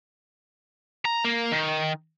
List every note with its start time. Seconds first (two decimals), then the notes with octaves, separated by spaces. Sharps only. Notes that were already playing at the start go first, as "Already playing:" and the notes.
1.05 A#5
1.25 A#3
1.52 D#3